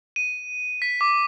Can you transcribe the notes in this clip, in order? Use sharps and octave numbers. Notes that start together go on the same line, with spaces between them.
D#7
B6
D6